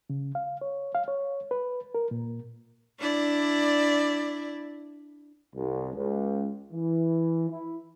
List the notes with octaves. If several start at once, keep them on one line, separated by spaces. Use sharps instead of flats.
C#3
F5
C#5
F5
C#5
B4
A#4
A#2
D4 E4 D5
C2
C#2
E3
E4